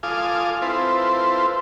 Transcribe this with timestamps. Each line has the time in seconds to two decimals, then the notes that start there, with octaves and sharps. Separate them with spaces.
0.03 F4 A4 F5 G#5 D6 D#6
0.62 C4 E4 F4 A4 B4 C5